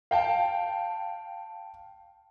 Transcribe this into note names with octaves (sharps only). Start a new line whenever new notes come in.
F5 G5 A5